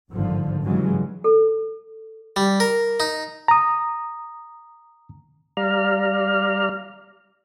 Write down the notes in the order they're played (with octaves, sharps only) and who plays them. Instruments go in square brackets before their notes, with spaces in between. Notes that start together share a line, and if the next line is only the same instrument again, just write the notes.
[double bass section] G1 F2 G#2 D3 D#3 F3
G2 C#3 E3 F#3 G#3
[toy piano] A4
[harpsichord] G3
A#4
D#4
[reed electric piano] A#5 D#6
[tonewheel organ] G3 D5 F5 A#5 F6